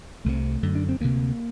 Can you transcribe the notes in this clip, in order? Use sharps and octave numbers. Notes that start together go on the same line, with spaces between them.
C2 C3 A3
F#2 D3
D4
C4
D2 C3 A#3